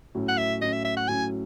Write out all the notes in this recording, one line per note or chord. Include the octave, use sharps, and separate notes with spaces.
A2 F#3 C#4
F#5
E5
A2 F#3 C#4 D#5
E5
E5
F#5
A2 F#3 C#4 G#5